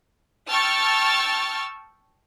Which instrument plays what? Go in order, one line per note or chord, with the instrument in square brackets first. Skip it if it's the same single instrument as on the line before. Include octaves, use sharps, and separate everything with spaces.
[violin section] G5 A5 C#6 E6 F6 A6